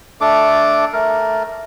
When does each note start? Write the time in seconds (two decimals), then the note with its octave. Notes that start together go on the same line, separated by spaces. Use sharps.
0.21 A3 D4 A4 D6
0.93 A3 A#4